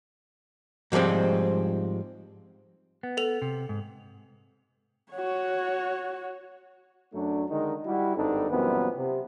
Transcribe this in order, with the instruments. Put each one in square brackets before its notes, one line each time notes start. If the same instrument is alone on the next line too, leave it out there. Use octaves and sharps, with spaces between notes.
[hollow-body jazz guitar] G#2 F3 G3 G#3 C4
[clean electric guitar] B3
[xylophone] A4 F7
[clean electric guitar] C3
G#2
[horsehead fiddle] F#4 C#5
[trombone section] F#2 F#3 A3 D4
D3 D#3 G#3 D#4
G3 E4 F#4
G#1 G2 C4 D4 D#4 A4
F#2 A#2 E3 G3 B3 C4
C3